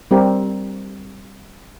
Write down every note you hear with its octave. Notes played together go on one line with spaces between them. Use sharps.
G3 C4 G4 A#4